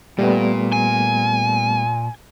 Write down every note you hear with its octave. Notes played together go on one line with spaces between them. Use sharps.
A#2 G3 A3 B3
G#5